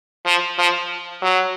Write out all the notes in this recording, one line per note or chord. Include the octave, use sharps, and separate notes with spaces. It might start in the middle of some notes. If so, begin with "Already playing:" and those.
F3
F3
F#3